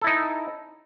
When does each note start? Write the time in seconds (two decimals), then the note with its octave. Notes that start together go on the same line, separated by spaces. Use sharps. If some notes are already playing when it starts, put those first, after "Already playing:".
0.02 A4
0.04 E4
0.07 D#4